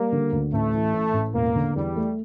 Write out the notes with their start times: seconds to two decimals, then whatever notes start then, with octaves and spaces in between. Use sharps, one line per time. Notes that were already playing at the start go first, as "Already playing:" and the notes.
Already playing: G3 A#3
0.12 D3
0.32 D2
0.53 A1 A3
0.74 E3
0.94 A2
1.13 A1
1.34 E1 A#3
1.55 D3
1.75 E2 G3
1.96 A3